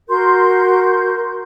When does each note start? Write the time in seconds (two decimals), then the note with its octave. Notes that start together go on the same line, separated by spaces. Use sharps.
0.09 F#4 A#4 C6 G6